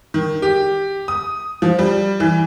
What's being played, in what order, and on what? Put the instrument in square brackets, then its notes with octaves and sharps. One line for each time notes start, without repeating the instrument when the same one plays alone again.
[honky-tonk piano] D#3
G4
D#6
F3
G3
E3